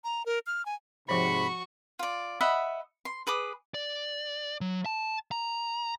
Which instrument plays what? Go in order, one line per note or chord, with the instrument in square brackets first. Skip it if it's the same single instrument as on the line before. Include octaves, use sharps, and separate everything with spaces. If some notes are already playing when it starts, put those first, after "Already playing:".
[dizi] A#5
A#4
F6
G#5
[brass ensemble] G#2 C3 [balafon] F3 C5 [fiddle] F#4 C#6 [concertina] B5
[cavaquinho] F4 D5
D#5 E5 F#5 B5
C6
G#4 B4 D6 D#6
[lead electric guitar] D5
F#3
A5
A#5